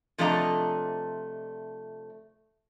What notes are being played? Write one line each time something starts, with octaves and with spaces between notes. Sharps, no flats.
C3 F3 A3 D4 D#5 A#5